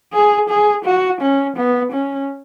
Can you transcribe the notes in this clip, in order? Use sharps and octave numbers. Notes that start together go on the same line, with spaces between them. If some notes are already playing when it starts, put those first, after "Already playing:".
G#4
G#4
F#4
C#4
B3
C#4